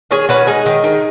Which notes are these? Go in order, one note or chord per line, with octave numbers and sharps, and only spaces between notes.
D#3 G#4 C#5
C#4 F#4 B4
G#3 D#4 G#4
D#3
D#3